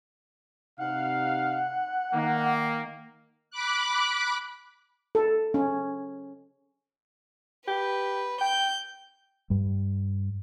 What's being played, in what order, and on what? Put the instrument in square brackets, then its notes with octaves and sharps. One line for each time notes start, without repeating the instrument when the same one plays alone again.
[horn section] C3 D#4 F5 [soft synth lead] F#5
[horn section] D#3 A#3
[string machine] B5 D6 F#6
[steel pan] A4
C#4
[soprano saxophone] G4 [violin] B4
[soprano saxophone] G5 [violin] G6
[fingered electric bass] G2 G3